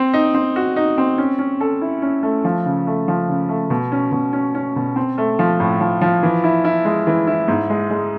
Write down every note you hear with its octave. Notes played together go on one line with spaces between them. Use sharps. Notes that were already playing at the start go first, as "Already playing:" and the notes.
Already playing: C4
D#4
C4
F#4
D#4
C4
C#4
C#4
A4
E4
C#4
A3
F3
C#3
A3
F3
C#3
A3
B2
C#4
B2
C#4
C#4
B2
C4
A3
F3
A2
F3
F3
E3
E4
E4
G#3
E3
E4
G#2
G#3
G#3